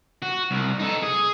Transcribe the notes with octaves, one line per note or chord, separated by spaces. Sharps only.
F#4
C2
D#4 A4
G#4